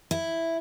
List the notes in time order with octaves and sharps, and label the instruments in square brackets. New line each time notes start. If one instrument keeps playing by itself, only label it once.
[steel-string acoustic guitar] E4